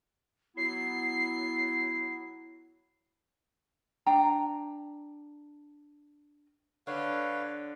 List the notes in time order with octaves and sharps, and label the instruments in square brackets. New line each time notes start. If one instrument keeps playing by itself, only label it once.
[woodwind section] F#3 B3 E4 [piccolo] C7
[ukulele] D4 G5 A#5
[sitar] D3 [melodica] B4 C#5 F5